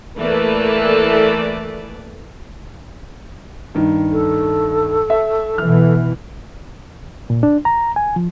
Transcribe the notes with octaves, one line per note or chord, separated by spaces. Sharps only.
E3 A3 A#3 A4 B4 D5
G2 D#3
A4
E5
B2 E3 F6
A#2
D4
A#5
G#5
F3